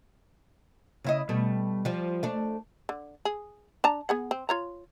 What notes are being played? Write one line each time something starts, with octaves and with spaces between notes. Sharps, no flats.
C#3 E4 D#5
B2 G3 A3
F3 G3
A3 D4
D3
G#4
D4 A5 A#5
B3 G#4 F#5
C4
F4 C#5 A#5